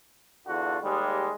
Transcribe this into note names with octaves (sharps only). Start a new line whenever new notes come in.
E2 D3 F4 F#4
D#2 G3 G#3